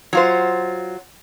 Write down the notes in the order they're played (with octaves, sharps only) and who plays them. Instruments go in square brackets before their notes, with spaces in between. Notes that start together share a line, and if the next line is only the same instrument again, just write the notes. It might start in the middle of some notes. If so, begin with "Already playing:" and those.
[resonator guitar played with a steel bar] F#3 F4 C5